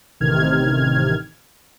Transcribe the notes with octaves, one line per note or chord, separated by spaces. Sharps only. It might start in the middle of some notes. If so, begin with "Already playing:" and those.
A1 C3 D#3 F6 G#6